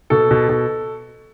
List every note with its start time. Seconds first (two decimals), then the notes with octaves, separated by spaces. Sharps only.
0.10 B2 A4
0.31 B2
0.49 B2